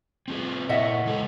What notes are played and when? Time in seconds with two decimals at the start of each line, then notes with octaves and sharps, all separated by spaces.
0.28 C4 F4 G#4
0.69 A#2 E4 D#5 E5 F#5
1.05 C#3 G#3 A4